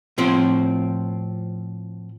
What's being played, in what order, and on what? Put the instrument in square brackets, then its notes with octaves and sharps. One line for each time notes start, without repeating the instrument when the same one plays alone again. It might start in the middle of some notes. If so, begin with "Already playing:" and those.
[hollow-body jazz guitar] A2 F3 C4